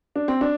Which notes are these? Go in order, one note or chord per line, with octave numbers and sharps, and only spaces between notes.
D4
C4
D4